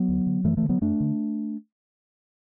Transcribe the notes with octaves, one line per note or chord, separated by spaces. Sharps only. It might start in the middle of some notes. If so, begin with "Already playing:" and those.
Already playing: F#3 B3
D2
D3
F#2 E3 A3
E3 A3
D3
F#3 B3
F#2 A3 D4
D3